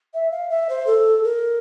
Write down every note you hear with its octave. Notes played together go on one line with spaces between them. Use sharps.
E5
F5
E5
C5
A4
A#4